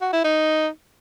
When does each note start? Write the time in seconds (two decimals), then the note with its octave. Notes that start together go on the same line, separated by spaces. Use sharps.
0.01 F#4
0.13 E4
0.24 D#4